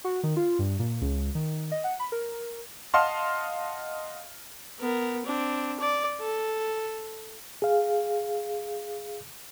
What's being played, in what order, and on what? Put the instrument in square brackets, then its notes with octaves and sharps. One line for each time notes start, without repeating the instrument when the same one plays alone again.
[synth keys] F#4
D#3
F4
G2
A#2
C#2
D#3
D#5
F#5
B5
A#4
[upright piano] D#5 F5 F#5 A5 C6 F6
[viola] B3 A#4
C4 D4
D5
A4
[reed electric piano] G#4 F5